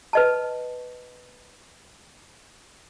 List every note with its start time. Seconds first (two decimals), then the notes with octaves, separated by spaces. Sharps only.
0.13 B4 D#5 A5